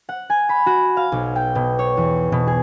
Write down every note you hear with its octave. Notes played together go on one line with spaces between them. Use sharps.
F#5
G#5
B5
F#4
F5
B1
G5
B2
C#5
E2
B2
G#4